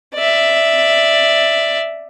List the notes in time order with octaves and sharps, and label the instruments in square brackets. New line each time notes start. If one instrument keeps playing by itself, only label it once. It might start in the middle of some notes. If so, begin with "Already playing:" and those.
[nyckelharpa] D5 E5